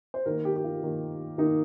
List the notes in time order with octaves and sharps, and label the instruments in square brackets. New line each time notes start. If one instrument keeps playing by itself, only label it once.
[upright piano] C5
D#3 A#3 A#4
G4
G4
F4
D#3 A#3
D#3 A#3 D#4